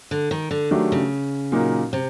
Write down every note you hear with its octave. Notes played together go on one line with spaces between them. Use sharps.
D3
D#3
D3
D#3 F#3 A3 D4 G4
C#3
A#2 F#3 A#3 D#4
C3